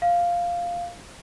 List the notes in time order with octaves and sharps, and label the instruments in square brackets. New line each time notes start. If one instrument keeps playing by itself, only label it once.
[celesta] F5